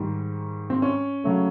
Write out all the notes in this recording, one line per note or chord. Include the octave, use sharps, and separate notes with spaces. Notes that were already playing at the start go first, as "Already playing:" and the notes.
Already playing: G#2 D#3 G3
C4
C#4
C#3 F#3 A3